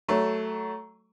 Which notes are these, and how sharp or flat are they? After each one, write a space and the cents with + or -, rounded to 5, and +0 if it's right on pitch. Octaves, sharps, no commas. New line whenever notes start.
F#3 +20 A3 +0